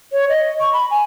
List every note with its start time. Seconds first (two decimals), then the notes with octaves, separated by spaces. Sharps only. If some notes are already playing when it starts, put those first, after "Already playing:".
0.12 C#5
0.29 D#5
0.60 C#6
0.73 B5
0.91 G#5